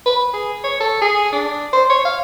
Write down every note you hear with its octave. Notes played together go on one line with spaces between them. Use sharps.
B4
G#4
C#5
A4
G#4
D4
C5
C#5
F5